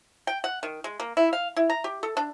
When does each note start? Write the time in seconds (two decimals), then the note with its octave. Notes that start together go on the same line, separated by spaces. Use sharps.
0.27 G5
0.44 F#5
0.63 D#3
0.84 G#3
1.00 A#3
1.17 E4
1.33 F5
1.56 E4
1.70 A#5
1.84 G4
2.03 A4
2.17 D4